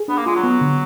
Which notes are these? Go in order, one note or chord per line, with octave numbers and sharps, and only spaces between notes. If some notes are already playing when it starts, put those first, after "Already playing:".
Already playing: G#4
B3 D4
A#3
G#3 F4
F#3
B3
D3